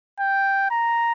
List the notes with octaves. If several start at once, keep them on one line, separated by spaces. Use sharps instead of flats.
G5
A#5